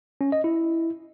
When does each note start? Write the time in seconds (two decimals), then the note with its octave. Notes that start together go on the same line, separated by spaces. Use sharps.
0.21 C#4
0.32 D#5
0.44 E4